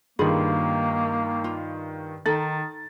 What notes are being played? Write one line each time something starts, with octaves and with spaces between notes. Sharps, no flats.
G2 D#3 A#3 F4 G#4 B5
F4
D#3 D#4 A4 A6